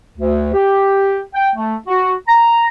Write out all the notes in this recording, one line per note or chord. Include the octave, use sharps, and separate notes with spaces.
D2
G4
G5
A3
F#4
A#5